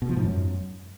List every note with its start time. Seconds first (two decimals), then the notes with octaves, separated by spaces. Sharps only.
0.02 B2
0.09 F3
0.16 G#2
0.24 F#2